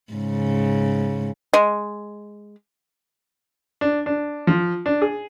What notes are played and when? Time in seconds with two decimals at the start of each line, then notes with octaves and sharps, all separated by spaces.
0.13 G#2 C#3
1.53 G#3
3.81 D4
4.06 D4
4.47 F3
4.86 D4
5.02 G#4